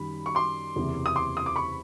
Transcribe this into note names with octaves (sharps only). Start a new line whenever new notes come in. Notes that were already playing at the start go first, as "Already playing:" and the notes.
Already playing: F#2 D#3 G3 B5
C#6
C6 D6
F#1 E2 C3 E3
D#6
C6 D6
D#6
D6
B5 C#6